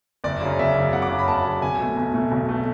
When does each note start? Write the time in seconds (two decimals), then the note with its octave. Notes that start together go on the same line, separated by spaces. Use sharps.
0.24 F#1 D5
0.41 F#2 C#3
0.59 F#1 E5
0.76 F#2 C#3
0.93 F#1 F#5
1.02 D6
1.10 F#2 C#3
1.19 B5
1.28 F#1 A5
1.45 F#2 C#3
1.62 B1 G#5
1.80 B2 A3
1.97 B1
2.14 B2 A3
2.32 B1
2.49 B2 A3